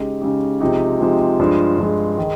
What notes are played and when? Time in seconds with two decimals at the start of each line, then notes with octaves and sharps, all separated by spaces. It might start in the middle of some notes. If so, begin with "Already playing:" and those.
Already playing: C#3 G#3 D#4 G4
0.22 C#3 G#3 D#4 G4
0.60 C3 F3 G#3 D#4 G4
1.01 C3 F3 G#3 D#4 G4
1.39 G2 F3 G#3
1.78 G2 F3 G#3
2.18 D#3 G#3 D#4